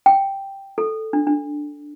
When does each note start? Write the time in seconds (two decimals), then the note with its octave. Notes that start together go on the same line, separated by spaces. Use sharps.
0.06 G5
0.78 A4
1.13 D4
1.27 D4